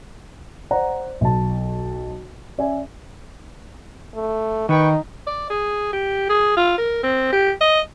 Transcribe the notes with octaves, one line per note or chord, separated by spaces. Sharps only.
C5 D5 F#5 A#5
B1 A5
C#4 D5 E5 G#5
A3
D#3 D#4 B4 G5 C#6
D5
G#4
G4
G#4
F4
A#4
C4
G4
D#5